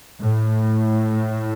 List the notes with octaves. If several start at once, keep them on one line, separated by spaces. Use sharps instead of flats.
A2